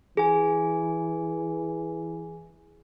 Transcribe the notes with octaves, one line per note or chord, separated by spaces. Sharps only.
E3 G#4 G#5